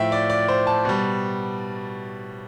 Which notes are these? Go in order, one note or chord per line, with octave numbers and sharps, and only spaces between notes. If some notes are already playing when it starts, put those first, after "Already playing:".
Already playing: A2 F3 E5 G5
D5
D5
C5
A5
B2 G3